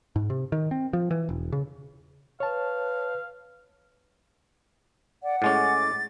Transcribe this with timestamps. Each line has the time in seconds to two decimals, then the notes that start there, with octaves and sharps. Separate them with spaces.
0.16 G#2
0.30 C3
0.52 D#3
0.71 C4
0.93 F3
1.11 E3
1.29 E1
1.52 C#3
2.40 B4 C#5 F5 A5
5.23 D5 F#5
5.42 A2 G#3 C#4 D6 A6